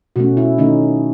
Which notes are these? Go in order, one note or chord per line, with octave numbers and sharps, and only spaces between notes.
B2 A3 C#4 F#4
E4
D#3 A3 C#4 D#4